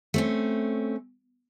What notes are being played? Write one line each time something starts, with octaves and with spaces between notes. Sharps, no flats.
A3 C4 C#4